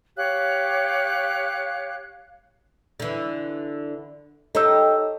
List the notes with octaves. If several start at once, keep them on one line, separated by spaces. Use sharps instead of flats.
G4 C#5 F5 F#6
D3 E3
D#4 G4 A4 C#5 E6